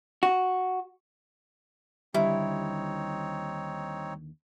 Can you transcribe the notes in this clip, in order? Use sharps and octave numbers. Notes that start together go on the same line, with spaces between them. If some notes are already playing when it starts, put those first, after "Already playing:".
F#4
D#2 D3 G3 C4 D#4 E4 C#5